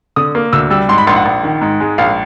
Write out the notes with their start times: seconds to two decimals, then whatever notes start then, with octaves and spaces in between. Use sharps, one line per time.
0.16 D3 D#6
0.35 A#3
0.53 D2 E6
0.70 G3 E6
0.89 G#2 C6
0.98 B5
1.07 A#1 C6
1.16 F#5
1.25 A#1
1.43 D#3
1.61 G#2
1.80 G#3
1.98 A#1 F5